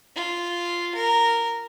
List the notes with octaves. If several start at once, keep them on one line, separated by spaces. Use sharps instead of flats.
F4
A#4